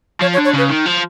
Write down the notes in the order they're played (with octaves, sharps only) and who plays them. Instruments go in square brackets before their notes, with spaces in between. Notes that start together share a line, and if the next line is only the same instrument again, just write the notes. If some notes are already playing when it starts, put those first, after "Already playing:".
[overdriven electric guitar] F3 [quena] C#5
[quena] C#5
[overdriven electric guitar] D3
[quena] C#5
[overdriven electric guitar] C#3 [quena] B4
[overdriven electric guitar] D#3
F3